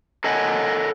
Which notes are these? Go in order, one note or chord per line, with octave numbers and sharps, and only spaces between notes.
A4 A#4 C#5 D#5 F#5 G#5